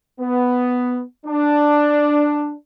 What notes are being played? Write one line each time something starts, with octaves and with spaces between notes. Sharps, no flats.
B3
D4